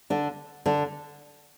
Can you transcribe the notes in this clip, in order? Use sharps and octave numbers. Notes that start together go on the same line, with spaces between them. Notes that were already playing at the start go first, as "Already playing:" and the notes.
D3 D4
D3 D4